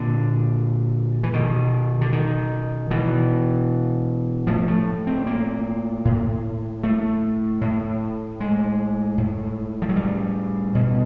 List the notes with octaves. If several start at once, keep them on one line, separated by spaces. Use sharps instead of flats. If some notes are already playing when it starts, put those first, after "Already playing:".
Already playing: A#2 D3
E3
B2 D#3
D3
D#3
B2 E3
A2 F3
A3
C4
A#3
A2
A3
A2
G#3
A2
F3
F#3
G3
B2